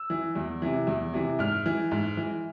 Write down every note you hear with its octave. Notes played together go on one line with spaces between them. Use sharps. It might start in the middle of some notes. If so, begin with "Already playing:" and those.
Already playing: E6
E3
E2
C3 E3
E2
C3 E3
G#2 F6
E3
G#2
E3